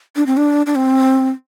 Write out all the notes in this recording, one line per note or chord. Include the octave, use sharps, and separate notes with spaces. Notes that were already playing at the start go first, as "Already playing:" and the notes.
D4
C4
D4
D4
C4